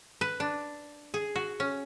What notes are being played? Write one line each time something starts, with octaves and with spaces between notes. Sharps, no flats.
B4
D4
G#4
F#4
C#4